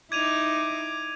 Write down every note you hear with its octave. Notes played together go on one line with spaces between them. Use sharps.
D#4 E4 D6 G#6 D#7 F7